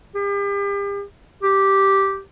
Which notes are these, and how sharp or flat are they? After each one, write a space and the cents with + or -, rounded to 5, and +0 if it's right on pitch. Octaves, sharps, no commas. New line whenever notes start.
G4 +40
G4 -5